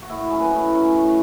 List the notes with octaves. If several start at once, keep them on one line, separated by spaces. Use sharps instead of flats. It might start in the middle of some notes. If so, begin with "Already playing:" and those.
F#4
A2 E4
F#4
F#3 C#4 G#4
B4
A2
F#3 C#4
A2